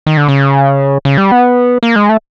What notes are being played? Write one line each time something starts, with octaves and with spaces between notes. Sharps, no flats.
D#3
D3
C#3
C#3
G3
B3
A#3
G#3
A3